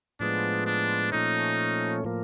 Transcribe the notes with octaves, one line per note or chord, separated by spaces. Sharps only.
A2 F3 G#3 B3 D4
D4
A#2 F3 A3 C#4 D#4
A2 F3 A#3